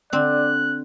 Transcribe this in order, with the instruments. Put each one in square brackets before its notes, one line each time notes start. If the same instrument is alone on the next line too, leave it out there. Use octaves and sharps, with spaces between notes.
[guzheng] D3 C4 [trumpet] D5 [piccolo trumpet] F#6